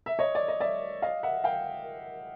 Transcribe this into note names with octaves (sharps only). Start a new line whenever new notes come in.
E5
C#5 D#5
D5
D#5
D5 E5
D#5 F5
E5 F#5
F5 G5